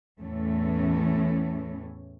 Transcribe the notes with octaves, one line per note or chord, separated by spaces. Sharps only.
E2 A2 E3 A3 C#4